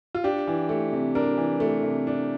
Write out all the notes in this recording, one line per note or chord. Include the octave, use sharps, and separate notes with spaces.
F4
D4 G4
E3
A3
C3
D4 A#4
E3
A3
C3
D4